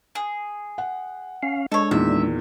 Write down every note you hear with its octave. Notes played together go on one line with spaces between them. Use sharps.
G#4
F#5
C#4 F5
G#3 D4 A4 C#5
E2 A#2 D#3 E5